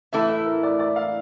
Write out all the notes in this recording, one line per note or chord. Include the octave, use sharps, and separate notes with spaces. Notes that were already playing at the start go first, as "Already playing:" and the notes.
A2 E3 A3 E4 E5
E5
A#4
D5
D5
F5